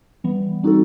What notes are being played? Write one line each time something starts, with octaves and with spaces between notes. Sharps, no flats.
E3 G3 B3
G3 C4 D#4 F#4 A4